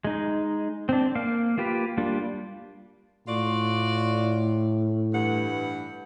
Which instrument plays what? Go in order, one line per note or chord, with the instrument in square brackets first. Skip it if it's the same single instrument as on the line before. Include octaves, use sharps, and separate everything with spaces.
[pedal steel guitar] G#3 D#4
C4 D4
A#3 F5
A#3 F4 G4 B4
G3 A#3 D4 F4
[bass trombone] A2 [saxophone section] F4 F#4 D5
[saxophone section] G2 E3 F#5